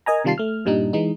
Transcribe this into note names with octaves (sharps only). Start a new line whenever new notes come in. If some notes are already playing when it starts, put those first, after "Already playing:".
A#4 D#5 G#5 A#5
C3 D#3 G3 F4 A5 C7
A3 F6
G2 A#2 G3 D4 D#4
E3 G#3 D#4